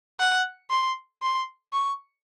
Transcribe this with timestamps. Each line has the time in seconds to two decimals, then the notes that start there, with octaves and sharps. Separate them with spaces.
0.19 F#5
0.70 C6
1.22 C6
1.73 C#6